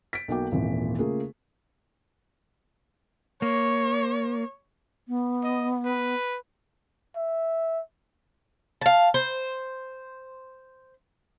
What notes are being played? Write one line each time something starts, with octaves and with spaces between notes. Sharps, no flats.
B6 D7
B1 A#3 D#4 F#4 G5 D6
D#1 G#1 A#2 E3
C#3 A3 A#3 F4 G#4
A#3 C#5
B3
D#5
B4
E5
F5 A5
C5